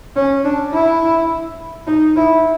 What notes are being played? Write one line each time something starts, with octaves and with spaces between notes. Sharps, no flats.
C#4
D4
E4
D#4
E4